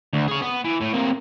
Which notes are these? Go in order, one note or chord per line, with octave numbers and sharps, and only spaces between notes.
D2
G#4 C#5
B3
E3
A2
C3 A#3